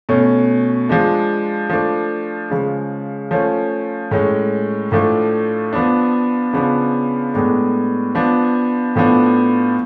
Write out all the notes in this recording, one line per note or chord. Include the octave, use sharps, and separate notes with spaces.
B2 A3 C#4
F3 G#3 D4
F3 A3 D4
C#3 F3 G#3
F3 A3 C#4
A2 G#3 C#4
A2 F3 A3 D4
F3 B3 D4
C#3 F3 B3 D4
A2 G#3 B3 D4
F3 B3 D4
A2 F3 B3 D4